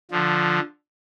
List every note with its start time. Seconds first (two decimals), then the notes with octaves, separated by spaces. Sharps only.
0.11 D3 F3